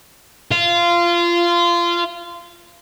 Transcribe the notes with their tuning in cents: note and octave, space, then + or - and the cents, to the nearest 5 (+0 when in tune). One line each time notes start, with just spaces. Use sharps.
F4 -20